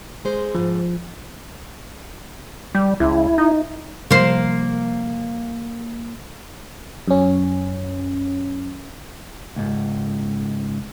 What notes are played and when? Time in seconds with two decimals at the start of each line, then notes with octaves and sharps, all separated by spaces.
0.25 G#3 C5
0.55 F2 G#2 F3
2.75 G3
3.00 C#2 E4
3.38 D#4
4.11 C3 F3 G3 A#3 C5
7.08 F#2 C#4
9.56 C#2 G#2